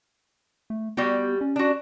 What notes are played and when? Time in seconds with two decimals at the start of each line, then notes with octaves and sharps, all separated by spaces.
0.70 A3
0.97 G3 B3 F#4 G4
1.41 C#4
1.56 D4 F#4